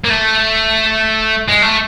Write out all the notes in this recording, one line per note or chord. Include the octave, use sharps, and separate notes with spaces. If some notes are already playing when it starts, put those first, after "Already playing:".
A#3
A3
G#3
A3